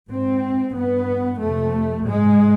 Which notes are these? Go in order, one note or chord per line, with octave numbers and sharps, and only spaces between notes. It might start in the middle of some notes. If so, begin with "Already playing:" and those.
G#2 C4
G2 B3
F2 C3 A3
G#2 G#3